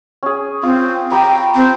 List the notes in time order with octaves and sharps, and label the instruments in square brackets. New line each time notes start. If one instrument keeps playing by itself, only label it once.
[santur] C#4 G#4
[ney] C4 [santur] F4
[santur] G4 A#5 B5 [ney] G5
[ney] C4